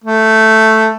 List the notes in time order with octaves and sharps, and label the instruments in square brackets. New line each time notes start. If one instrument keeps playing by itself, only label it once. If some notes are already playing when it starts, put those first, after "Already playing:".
[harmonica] A3